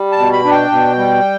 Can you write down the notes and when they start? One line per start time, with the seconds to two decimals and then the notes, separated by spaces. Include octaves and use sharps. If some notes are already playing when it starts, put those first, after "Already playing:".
Already playing: G3
0.12 A5
0.18 B2
0.33 B5
0.45 D4
0.51 G5
0.72 B2
0.97 G3